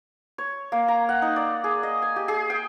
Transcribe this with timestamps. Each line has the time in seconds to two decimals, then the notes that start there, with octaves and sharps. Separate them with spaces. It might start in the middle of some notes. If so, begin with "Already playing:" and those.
0.38 C#5
0.72 A#3
0.88 A#5
1.09 F#5
1.22 D#4
1.36 D5
1.64 G#4
1.83 D#5
2.02 G#5
2.16 G4
2.28 G#4
2.50 G5